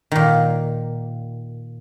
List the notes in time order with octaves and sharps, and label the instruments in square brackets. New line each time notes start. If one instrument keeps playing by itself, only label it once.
[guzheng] A#2 D#3